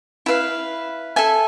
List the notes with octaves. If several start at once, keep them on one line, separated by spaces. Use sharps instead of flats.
E4 B4 F5
A4 E5 G#5